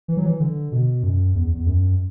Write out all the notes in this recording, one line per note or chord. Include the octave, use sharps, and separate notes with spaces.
E3
F#3
E3
D3
B2
F#2
E2
E2
F#2